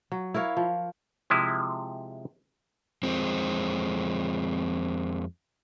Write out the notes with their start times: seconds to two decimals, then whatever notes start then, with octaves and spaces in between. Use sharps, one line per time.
0.12 F#3
0.34 E4 A#4 C#5 F5
0.57 F3
1.30 C3 F3 G#3 E4
3.03 F2 G#3 C4